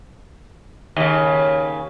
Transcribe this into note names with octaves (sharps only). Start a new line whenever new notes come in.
D#2 C#3